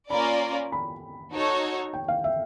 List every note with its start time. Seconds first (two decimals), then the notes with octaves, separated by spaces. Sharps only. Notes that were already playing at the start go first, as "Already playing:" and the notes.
0.10 A#3 C#4 F4 A#4 D5 B5
0.72 B5
1.33 D#4 F#4 A4 C#5
1.93 G5
2.08 F5
2.24 E5